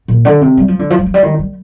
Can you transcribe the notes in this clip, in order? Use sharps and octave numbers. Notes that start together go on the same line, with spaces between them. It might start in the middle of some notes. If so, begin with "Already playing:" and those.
A#2
D3
C3
G3
F3
D3
F3
G3
F3
G3
D#3
G3